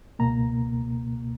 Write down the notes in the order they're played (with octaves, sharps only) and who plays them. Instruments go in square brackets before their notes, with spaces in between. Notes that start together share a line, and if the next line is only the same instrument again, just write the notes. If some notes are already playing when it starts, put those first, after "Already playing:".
[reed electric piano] C#2 B2 A#3 A#5